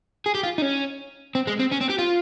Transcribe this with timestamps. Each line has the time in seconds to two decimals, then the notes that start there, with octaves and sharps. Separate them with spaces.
0.26 G#4
0.35 G4
0.43 F4
0.58 D#4
0.62 C#4
1.35 C4
1.47 G#3
1.59 C4
1.71 C#4
1.81 C4
1.89 G4
1.98 F4